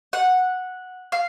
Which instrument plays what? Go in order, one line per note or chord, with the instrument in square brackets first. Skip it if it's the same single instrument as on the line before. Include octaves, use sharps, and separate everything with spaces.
[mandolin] F#5
F5